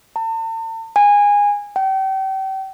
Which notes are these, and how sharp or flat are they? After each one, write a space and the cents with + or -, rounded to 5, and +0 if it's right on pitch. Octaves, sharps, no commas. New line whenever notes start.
A5 +40
G#5 -20
G5 -35